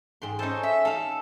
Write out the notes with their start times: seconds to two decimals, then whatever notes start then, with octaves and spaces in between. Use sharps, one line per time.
0.22 G#2 G5 C6
0.39 C#4 D#4 A4 C5
0.63 E5
0.85 D#4 A4 F5